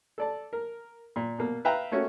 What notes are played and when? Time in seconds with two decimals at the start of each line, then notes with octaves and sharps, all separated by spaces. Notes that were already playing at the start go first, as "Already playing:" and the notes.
0.18 A4 D5 A5
0.53 A#4
1.16 A#2
1.39 B2 A#3
1.65 B4 E5 F5 G5 A#5
1.91 A3 A#3 C#4 F#4 C#5 E5